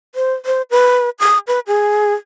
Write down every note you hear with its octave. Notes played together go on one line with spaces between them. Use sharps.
C5
C5
B4
D#6
B4
G#4